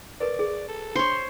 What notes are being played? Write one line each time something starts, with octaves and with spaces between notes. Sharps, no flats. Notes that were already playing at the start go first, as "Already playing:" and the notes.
A#4 B4 D5
G#4
A4
D4 C5 C#5 C6